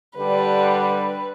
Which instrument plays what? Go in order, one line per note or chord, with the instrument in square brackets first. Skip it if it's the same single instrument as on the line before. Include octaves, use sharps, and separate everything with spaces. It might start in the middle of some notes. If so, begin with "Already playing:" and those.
[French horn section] D3 G3 [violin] B4